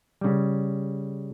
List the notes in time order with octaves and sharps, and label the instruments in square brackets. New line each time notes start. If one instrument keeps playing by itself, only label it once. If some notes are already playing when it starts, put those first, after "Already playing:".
[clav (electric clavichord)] C#3 G3